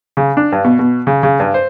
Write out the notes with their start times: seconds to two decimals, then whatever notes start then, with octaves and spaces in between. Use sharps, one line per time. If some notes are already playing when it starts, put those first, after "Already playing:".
0.17 C#3
0.37 D4
0.52 G2
0.64 B2
0.79 B2
1.07 C#3
1.23 C#3
1.40 G2
1.54 C5